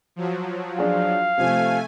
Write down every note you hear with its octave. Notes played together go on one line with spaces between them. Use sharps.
F3 F#3
D4 G#4 F5
C3 F3 A3 G#5